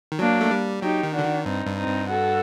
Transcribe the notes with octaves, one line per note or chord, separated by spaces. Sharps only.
D#3
F#3 A#3 D4
A3
G3
F#3 D#4 G4
D#3
D3 D4 F#4
D#3
G2 C4 D#4
G2
C4 D#4
G2
F#4 A4